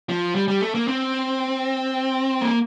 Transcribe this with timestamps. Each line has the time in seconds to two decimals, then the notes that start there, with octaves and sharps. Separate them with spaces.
0.09 F3
0.35 G3
0.48 G3
0.61 A3
0.75 A#3
0.88 C4
2.41 A#3